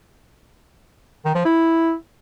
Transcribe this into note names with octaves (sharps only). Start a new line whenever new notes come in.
D#3
F3
E4